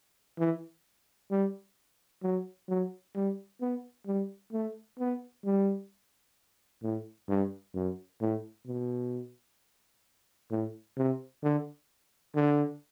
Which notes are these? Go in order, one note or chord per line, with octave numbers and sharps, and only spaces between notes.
E3
G3
F#3
F#3
G3
B3
G3
A3
B3
G3
A2
G2
F#2
A2
B2
A2
C3
D3
D3